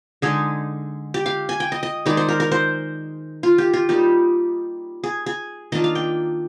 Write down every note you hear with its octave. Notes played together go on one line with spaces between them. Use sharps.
D3 G#3 D#4 G#4
G4
F5
G#5
G5
D#5
D#5
D#3 G#3 D#4 D5
C5
A#4
A#4
C5
F4
G4
F4
G3 A#3 D#4 G4
G#4
G#4
D#3 A#3 D4 F4 D#5
F5
G5